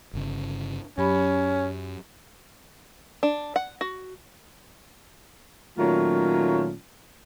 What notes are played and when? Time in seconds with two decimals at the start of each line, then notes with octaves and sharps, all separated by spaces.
0.13 G1 C#3
0.98 F#2 F#3 C#4 G4 B5
3.23 D4
3.56 F#5
3.81 F#4
5.78 A#2 D#3 F#3 A3 C#4 F4